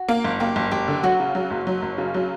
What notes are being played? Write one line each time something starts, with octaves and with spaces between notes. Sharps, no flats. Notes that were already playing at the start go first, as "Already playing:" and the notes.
Already playing: F#4
A#3
F#1
A#3 G4
F#1
F#1 G4
D3
F#3 F#4
C#3
F#3
F#1
F#3
F#1
C#3
F#3